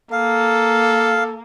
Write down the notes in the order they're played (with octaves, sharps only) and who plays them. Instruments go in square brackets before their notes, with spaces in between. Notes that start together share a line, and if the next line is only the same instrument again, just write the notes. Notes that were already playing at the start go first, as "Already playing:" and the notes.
[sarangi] A#3 [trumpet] A4 [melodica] F5